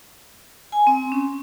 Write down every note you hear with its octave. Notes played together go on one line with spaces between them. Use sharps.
G#5
C4
C#4